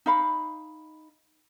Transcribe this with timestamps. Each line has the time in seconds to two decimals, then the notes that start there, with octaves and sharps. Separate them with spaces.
0.06 D#4 F5 B5